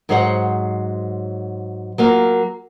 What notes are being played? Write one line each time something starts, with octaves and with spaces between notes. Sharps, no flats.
G#2 F#3 G#4 C5 C#5 F#5
F#3 A#3 F4